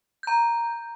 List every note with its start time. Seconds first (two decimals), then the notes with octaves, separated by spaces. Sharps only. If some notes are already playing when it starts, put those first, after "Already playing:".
0.23 A#5 G6